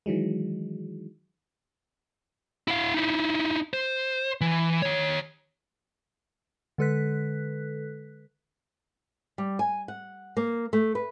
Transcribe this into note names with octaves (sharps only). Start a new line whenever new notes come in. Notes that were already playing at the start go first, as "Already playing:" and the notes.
D#3 E3 F#3 G#3
E4 F5
D#4 E4
C5
E3
D#3 C#5
D3 G#3 A4 B4 F#6 B6
G3
G#5
F#5
A#3
A3
B4